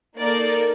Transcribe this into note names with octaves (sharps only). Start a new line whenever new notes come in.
A#3 D#4 A4 A#4 D5